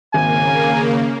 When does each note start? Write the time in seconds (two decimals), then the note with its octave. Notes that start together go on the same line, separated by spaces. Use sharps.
0.14 G#1 C#3 A#3 G#5